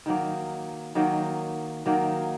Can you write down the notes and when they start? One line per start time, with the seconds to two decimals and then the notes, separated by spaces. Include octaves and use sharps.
0.06 D#3 F#3 A#3
0.95 D#3 F#3 A#3
1.86 D#3 F#3 A#3